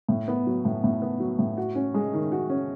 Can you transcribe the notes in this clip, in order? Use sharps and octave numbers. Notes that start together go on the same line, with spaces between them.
A2
B3
F#3
A2
A2
B3
F#3
A2
F#4
C#4
G#3
D#3
F#4
C#4